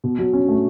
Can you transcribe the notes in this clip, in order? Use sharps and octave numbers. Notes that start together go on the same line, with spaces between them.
B2
F#3
C#4
A3